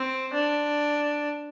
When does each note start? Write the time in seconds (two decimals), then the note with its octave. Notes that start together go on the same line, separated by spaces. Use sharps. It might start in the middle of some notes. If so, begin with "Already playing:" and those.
Already playing: C4
0.33 D4